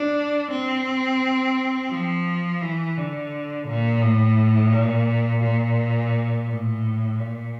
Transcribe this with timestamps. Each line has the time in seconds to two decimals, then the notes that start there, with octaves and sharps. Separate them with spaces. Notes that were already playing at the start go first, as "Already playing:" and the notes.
Already playing: D4
0.50 C4
1.91 F3
2.62 E3
2.97 D3
3.68 A#2
4.03 A2
4.73 A#2
5.43 A#2
6.49 A2
7.19 A#2